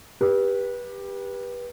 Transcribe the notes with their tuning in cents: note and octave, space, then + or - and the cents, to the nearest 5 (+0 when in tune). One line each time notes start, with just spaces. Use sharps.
G4 +15 B4 -25